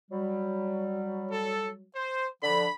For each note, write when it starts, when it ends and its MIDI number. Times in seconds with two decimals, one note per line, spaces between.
0.12 1.85 54
0.12 1.85 55
1.32 1.70 69
1.96 2.28 72
2.43 2.65 50
2.43 2.65 53
2.43 2.73 83